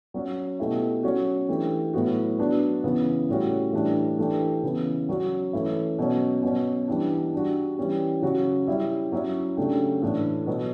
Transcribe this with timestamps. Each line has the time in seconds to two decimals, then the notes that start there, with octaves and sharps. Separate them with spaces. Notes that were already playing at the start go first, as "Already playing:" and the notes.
0.14 F#3 C#4 F#4
0.59 B2 A3 E4 G4
1.03 F#3 C#4 F#4
1.48 E3 A3 D4 G4
1.94 A2 F#3 B3 F#4
2.38 F#3 B3 D4 F#4
2.84 C#3 E3 B3
3.29 A2 G3 C#4 F#4
3.73 A2 E3 G3 D4
4.19 E3 A3 D4 G4
4.63 C#3 E3 B3
5.09 F#3 C#4 F#4
5.53 E3 A3 C#4 E4
5.98 B2 F#3 C#4
6.43 B2 F#3 C#4
6.88 E3 G3 D4
7.33 G3 D4 F#4
7.77 E3 G3 C#4 G4
8.22 C#3 F#3 C#4 F#4
8.67 G3 C#4 E4 G4
9.12 F#3 C#4 E4
9.57 C#3 F#3 A3 D4 G4
10.02 A2 E3 A3 D4
10.47 B2 F#3 B3